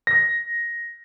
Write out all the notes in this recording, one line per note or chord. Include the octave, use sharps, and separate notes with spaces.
A#6